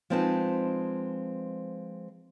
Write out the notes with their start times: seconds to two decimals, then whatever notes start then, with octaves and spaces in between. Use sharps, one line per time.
0.10 F3 G#3 C4 D#4 B4 A5